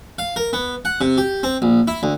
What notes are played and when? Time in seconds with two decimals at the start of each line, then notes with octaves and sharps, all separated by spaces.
0.19 F5
0.36 A#4
0.53 B3
0.85 F#5
1.01 C3
1.18 G4
1.43 C4
1.62 A#1
1.88 E4
2.03 D2